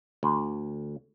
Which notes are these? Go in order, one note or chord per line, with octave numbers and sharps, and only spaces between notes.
D2